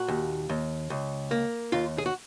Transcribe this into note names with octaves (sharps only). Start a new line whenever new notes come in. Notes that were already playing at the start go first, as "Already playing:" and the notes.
Already playing: A#2 F#4
D#2
D#2
C#2
A#3
D#2 F4
G#4
F#4